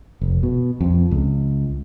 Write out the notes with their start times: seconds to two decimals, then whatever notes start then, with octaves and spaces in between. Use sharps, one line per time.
0.21 F1
0.43 B2
0.81 F2
1.11 C#2